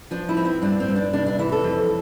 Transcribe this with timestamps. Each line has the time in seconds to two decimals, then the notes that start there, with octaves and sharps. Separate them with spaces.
0.11 F3 D4
0.29 E4
0.37 C4
0.45 E4
0.62 G2 D4
0.80 C4
0.88 G2
0.96 D4
1.13 C3 D4
1.26 D4
1.39 E3 E4
1.52 A4
1.64 F2